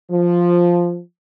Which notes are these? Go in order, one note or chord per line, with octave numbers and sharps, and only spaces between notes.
F3